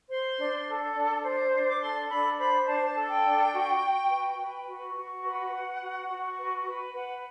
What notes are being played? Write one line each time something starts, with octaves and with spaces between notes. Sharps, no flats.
C5 C6
D4
A4
D4
C5
D4
D6
A4 C6
D4 B5
C5 B5
D4 A5
A4
G5
D4
F#4
F#4
B4
B4
F#4
F#4
B4 F#5
B4
F#4
F#4
B4
B4
B4 F#5